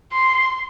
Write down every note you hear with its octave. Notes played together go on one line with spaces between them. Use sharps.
C6